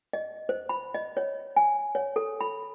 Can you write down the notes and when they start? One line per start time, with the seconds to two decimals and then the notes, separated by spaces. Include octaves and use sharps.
0.13 D#5
0.49 C5
0.69 B5
0.94 D#5
1.17 C#5
1.56 G#5
1.95 C#5
2.16 A4
2.41 B5